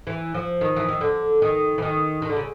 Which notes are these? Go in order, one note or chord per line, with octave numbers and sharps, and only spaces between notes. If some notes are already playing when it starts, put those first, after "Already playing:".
E3
F3
D#3
E3
D#3
D3
D#3
E3
D#3
D#3
D3
C#3